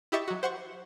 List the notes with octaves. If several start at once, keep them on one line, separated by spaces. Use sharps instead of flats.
E4 G4 D#5 E5 C#6 A6
F#3 F#4
C5 F#5 C6 C#6